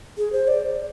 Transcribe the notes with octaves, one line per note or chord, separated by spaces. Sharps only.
G#4
C5
D5